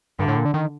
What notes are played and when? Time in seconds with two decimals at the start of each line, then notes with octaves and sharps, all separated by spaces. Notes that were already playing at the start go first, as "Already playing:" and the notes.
0.19 G2 D3
0.28 A2
0.37 A#2
0.45 D3
0.54 D#3